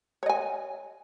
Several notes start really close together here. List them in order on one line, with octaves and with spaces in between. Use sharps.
C#5 D#5 G#5